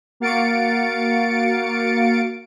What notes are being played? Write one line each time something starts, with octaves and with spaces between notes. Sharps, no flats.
A#3 F#4 F5 A6 C#7 D7